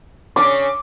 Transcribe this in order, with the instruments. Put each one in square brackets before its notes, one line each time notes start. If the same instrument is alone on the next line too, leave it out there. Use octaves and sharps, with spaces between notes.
[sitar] C#3 C#4 D4 [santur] D6